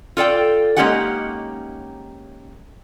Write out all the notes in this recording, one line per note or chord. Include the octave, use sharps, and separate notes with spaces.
F4 A4 D5 G5
G#3 A#3 C#4 D#4 G4 F#5